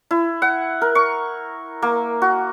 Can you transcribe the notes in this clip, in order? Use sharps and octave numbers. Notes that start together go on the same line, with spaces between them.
E4
F#5
A#4
C#6
A#3
F#4